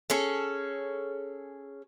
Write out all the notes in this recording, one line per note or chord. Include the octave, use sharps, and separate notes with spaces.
C#4 G#4 A4